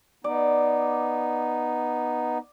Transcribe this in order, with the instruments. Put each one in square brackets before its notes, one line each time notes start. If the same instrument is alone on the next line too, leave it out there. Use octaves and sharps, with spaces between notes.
[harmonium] B3 D#4 [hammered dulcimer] D5